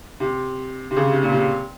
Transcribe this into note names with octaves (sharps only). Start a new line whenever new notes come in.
C3
C3
C#3
C3
A#2
C3